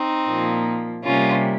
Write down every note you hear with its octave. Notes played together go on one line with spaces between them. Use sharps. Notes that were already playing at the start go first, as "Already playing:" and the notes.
Already playing: C4 D#4
A#2 F3 A#3
C3 G3 A#3 C#4 F4